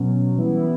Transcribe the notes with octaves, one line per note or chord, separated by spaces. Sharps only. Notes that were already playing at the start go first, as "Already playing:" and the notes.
Already playing: B2 F#3 C#4
E3 G3 B3 E4